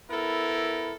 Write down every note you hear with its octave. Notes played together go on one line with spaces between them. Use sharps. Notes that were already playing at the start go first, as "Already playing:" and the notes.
B3 E4 A4 A#4